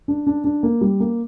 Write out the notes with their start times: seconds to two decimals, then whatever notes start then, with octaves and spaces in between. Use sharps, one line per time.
0.08 D4
0.27 D4
0.44 D4
0.63 A#3
0.81 G3
1.00 A#3